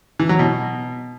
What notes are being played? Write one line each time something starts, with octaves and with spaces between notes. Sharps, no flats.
E3
F#3
B2